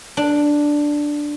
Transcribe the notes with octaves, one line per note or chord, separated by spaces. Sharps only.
D4